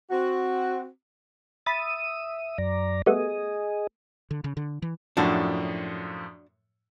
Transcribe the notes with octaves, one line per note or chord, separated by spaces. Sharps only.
C4 F#4
E5 B5 D#6 A6
F#2 D5 A#5
G3 A3 B3 G#4 D#5
D3
C#3
D3
E3
F#2 A2 F3 D4 F#4